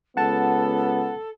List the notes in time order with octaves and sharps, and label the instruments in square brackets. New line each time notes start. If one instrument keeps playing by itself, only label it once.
[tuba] C#2 [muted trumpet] B3 [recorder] A4 [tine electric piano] F#5 A5